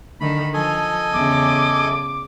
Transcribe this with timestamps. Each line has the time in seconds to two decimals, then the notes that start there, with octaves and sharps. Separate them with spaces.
0.21 D3 D#3 B5
0.54 F3 A4 D#5 G#5
1.13 E2 C#3 D6